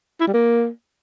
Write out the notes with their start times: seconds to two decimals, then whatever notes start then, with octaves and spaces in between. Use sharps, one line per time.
0.21 E4
0.27 G3
0.34 A#3